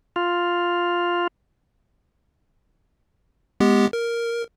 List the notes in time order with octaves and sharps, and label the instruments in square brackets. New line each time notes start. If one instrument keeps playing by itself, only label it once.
[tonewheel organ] F4
[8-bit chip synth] G#3 B3 G4
A#4